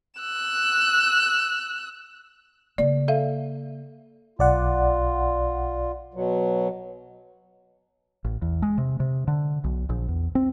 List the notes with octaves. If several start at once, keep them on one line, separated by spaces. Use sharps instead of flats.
E6 F#6
C#3 A#3 D5
A4 E5 F5
B1 F4 D5 F#5
B2 F#3
A1
E2
G#3
C3
C3
D3
B1
A#1
E2
C4